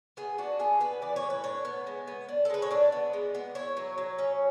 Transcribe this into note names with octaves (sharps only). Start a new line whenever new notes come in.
B3 G#4
D4 F#4
B3 G#4
B3 B4
E3 D5
C#5
A2
B4
D4 C#5
B3
G#3
B3
D4
A4
G#3 B4
C#5
D4 D5
B3
G#3
B3
E4 C#5
F#3
F#3
C#4